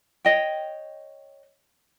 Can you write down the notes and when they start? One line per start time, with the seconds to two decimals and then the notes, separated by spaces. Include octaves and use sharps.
0.25 C#5 D#5 G5